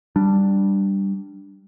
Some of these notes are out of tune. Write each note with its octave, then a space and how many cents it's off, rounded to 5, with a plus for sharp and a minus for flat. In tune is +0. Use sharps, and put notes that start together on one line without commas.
G3 +0 D4 +5